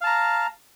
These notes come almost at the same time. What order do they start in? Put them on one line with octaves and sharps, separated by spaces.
F5 A5 A#5